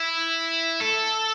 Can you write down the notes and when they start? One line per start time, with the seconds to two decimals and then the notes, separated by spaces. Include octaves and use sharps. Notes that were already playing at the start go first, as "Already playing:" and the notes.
Already playing: E4
0.80 A4